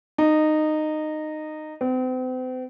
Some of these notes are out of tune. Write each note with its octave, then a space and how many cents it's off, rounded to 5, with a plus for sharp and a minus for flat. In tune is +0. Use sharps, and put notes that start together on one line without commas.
D#4 -15
C4 -40